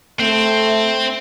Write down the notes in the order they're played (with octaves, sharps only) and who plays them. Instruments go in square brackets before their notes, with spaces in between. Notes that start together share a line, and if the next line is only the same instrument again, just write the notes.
[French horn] A3 [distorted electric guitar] C4